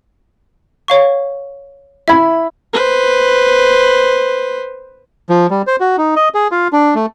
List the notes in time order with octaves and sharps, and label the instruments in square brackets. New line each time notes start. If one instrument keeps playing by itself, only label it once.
[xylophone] C#5 F5 C#6
[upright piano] E4 B5 [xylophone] E5 G#6
[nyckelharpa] B4 C5
[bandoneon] F3
G3
C5
F#4
D#4
D#5
G#4
F4
D4
A3